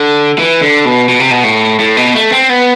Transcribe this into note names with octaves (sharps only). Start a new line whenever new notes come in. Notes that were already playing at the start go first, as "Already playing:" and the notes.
Already playing: D3
E3
D3
B2
B2
C3
B2
A2
A2
B2
A3
C4
B3